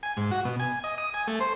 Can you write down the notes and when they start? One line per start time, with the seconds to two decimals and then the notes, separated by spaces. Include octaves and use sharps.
0.03 G#5
0.17 G#2
0.31 F#4
0.45 B2
0.60 G#5
0.84 D#5
0.98 D#6
1.14 G#5
1.28 A3
1.40 C5